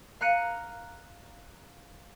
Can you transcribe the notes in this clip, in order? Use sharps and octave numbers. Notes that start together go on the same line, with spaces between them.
F5 A#5 F#6 C#7 D#7